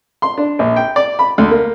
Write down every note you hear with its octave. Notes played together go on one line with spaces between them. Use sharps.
C6
D4
A#1
G5
D5
B5
D2
A#3